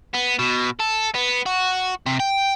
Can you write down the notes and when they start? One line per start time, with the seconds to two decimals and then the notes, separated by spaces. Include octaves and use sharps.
0.14 B3
0.39 B2
0.79 A4
1.14 B3
1.46 F#4
2.06 C3
2.20 G5